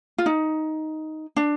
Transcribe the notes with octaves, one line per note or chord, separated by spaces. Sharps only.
F4
D#4
D4